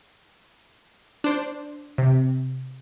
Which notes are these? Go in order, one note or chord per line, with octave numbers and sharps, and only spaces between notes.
D4 C5
C3